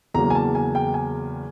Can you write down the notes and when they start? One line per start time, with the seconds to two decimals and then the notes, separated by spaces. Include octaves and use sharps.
0.14 E2 C#3 F#3 A#3 A#5
0.30 G#5
0.35 A5
0.55 G#5
0.75 G5
0.94 G#5